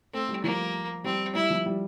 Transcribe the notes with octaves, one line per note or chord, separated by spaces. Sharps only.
A3 C4
G3
F3 A#3
G3 C4
G3 E4
F3
G3